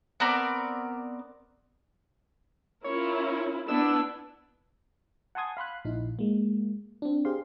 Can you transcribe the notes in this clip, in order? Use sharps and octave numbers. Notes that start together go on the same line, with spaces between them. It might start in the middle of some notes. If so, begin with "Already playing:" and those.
B3 C4 A#4 D5
C#4 E4 F4 A#4 C#5
B3 D4 E4 E6
F#5 G#5 A5 C6 D#6 G#6
F5 B5 C6 F#6
A#1 D#4 E4
G#3 A#3
C4 D4
G4 G#4 C5 F5 C6